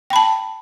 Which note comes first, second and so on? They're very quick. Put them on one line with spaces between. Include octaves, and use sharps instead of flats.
G5 B5 A5